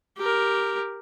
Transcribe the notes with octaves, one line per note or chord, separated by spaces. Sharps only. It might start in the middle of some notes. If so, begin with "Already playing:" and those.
G4 A#4